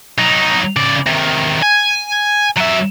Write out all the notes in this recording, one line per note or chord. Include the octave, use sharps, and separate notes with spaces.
F#3 D#4
C#3 D5
C3 D#3
G#5
F#3 E5